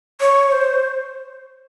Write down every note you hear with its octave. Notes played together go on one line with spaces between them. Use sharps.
C#5
C5